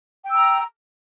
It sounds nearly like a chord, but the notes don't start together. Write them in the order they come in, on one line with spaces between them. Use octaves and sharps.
G5 E6 A#5